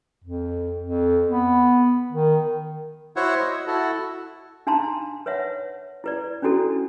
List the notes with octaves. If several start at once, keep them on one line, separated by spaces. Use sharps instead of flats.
F2
F2
B3
D#3
E4 F#4 C5 C#5 E5 F#5
D#5
E4 F#4 A4
D4 D#4 F5 A5 A#5 C6
B4 C#5 E5 F#5
E4 B4 D5
C#4 D4 E4 F#4 A4